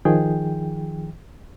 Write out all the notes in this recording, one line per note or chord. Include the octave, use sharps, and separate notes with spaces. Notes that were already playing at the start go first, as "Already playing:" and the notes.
D#3 F3 G#4 G5